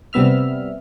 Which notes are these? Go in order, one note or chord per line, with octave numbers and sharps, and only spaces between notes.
C3 G3 B3 E5 F6